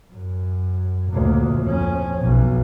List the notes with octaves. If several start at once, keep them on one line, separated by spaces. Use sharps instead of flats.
F#2
D2 A#2
F2 C#4
B1